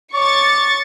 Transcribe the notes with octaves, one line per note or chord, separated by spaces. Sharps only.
C#5 C#6 D6 A6